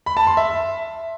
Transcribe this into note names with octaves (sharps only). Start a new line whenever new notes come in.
B5
A5
C6
E5